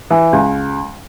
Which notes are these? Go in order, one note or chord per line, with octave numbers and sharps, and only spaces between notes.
E3
C#2